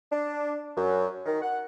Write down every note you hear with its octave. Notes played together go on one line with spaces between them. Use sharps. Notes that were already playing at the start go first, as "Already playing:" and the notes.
D4
F#2
D#3
F#5